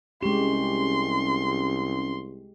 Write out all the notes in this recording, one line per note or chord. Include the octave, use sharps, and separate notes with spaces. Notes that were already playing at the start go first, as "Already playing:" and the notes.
C2 G#3 C#4 G4 C6